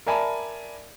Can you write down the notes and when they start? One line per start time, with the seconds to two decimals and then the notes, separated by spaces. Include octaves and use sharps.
0.07 A#4 D5 E5 G#5 A5 B5